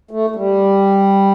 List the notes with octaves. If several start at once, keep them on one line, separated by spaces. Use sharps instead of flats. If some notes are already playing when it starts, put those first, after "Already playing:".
A3
A3
G3